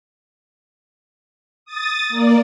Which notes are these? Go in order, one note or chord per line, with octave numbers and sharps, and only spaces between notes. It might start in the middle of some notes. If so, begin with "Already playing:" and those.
D#6 A6
A#3 D5